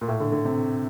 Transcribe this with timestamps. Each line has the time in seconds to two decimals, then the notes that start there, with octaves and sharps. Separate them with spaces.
0.01 A#2
0.08 A2
0.20 D3
0.32 D3
0.45 C3